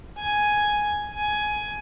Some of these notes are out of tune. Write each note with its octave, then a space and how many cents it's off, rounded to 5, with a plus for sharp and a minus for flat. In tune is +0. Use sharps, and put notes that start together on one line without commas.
G#5 +5
G#5 +15